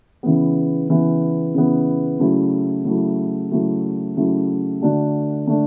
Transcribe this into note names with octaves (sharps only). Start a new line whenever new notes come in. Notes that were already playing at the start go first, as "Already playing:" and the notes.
C#3 E3 B3
C#3 E3 B3
C#3 E3 B3
C#3 F#3 A3 E4
C#3 F#3 A3 E4
C#3 F#3 A3 E4
C#3 F#3 A3 E4
D3 A3 D4 F#4
D3 A3 D4